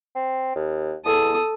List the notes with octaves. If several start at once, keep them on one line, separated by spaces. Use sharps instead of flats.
C4
D#2
E2 A4 D#6